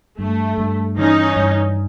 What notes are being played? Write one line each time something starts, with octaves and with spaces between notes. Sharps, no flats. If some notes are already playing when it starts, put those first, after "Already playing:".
G2 A3
G2
E3 C#4 D#4
G2